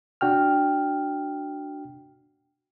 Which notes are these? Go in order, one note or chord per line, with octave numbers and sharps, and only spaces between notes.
D4 F#4 G5 F6